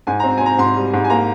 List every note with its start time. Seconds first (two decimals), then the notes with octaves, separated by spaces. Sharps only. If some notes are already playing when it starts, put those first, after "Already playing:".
0.07 G#2 G#5
0.20 C4 A#5
0.37 G#5
0.41 C4 A#5
0.58 G#2 C6
0.76 G3
0.93 G#2
1.04 G#5
1.10 A#3 A#5